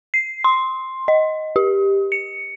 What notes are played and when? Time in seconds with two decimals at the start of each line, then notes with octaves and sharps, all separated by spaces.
0.14 C7
0.44 C6
1.08 D#5
1.56 G4
2.12 C#7